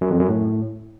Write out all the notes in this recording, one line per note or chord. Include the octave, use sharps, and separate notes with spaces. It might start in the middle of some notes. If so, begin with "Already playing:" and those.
F#2
F2
F#2
A2